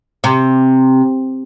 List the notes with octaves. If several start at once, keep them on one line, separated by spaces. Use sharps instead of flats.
C3